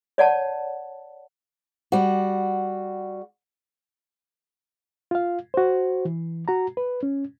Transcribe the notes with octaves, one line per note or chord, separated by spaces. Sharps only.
C#5 D5 F#5 A5
G3 F#4
F4 F5
F#4 C5
E3
F#4 A#5
B4
C#4